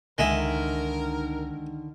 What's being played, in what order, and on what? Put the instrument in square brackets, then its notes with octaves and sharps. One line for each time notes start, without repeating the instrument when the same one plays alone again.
[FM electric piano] C#2 D#4 [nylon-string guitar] D3 D#3 [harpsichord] G#3 E4 [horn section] A#4